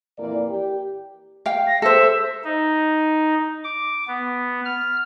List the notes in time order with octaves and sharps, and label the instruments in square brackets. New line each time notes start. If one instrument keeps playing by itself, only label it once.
[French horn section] F2 A#2 E3 A#3 D5
G4
[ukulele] F5 G5
[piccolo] A#6
[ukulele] A4 C5 [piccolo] E5
[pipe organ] D#4
D6
B3
F6